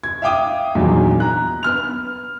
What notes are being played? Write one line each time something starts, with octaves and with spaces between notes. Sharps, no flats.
G#6
E5 F5 G5 D6 D#6
E2 G2 A#2 D#3 F#3
A#5 F#6
B3 F6 F7